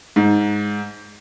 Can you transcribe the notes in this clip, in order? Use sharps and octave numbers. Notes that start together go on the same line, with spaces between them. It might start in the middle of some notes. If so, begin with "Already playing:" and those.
G#2